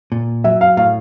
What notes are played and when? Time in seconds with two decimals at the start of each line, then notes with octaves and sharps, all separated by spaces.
0.12 A#2
0.44 F#3 E5
0.61 F5
0.77 A2 F5